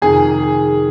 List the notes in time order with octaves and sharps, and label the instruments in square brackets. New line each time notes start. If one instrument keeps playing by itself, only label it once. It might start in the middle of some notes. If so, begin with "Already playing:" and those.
[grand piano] F2 C3 D#3 [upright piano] G#4